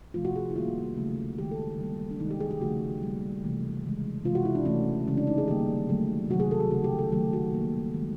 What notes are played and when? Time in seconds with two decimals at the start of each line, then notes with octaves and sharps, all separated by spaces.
0.14 C3 F3 A3 F4
0.25 F#4
0.36 G#4
0.50 E4
0.56 D#3 G3 A#3 F4
0.96 C#3 F#3 A3
1.38 D#3 G#3 G4
1.51 A4
1.78 D3 G3 A#3
2.11 D4
2.20 C3 D#3 G#3 D#4
2.31 G4
2.40 G#4
2.51 G4
2.61 C#3 F3 A3 F#4
3.02 B2 G3 A#3
3.44 C3 E3 A3
3.84 C#3 E3 G#3
4.25 C3 E3 G#3 F4
4.35 F#4
4.45 E4
4.55 D4
4.65 C3 E3 A3 C#4
5.07 C#3 E3 G#3 C#4
5.17 D4
5.27 D#4
5.38 G#4
5.48 D#3 G3 A#3 G4
5.89 D3 F#3 A3
6.30 C3 D#3 F#3 A3 F#4
6.40 G#4
6.51 A4
6.60 G#4
6.70 C#3 F#3 A3 F#4
6.84 G4
6.99 A4
7.12 D#3 F#3 A3 G4
7.33 F#4
7.53 B2 G3 A#3
7.94 D#3 G#3